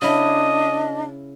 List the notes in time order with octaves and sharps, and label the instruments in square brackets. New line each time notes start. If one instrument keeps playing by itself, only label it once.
[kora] C#3 E4 [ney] D4 [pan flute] D#5 [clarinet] D#6